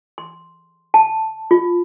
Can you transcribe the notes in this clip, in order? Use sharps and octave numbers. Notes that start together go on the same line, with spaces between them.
C6
A5
F4